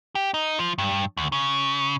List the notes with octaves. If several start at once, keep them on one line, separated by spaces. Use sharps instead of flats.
G4
D#4
F3
G2
D2
C#3